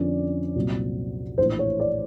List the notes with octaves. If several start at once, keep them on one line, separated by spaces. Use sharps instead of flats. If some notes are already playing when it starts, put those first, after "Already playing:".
Already playing: F2 D3 F3 A#3 C#4 D5
C2 A#2 F#3
A#1 A2 E3 C5
C#5
D5